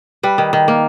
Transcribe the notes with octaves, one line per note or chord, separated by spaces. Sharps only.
G3 B4
D#3
D#3
A#3